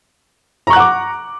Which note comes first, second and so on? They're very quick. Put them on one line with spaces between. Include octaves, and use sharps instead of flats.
A#5 C#6 F#6 F#5 D6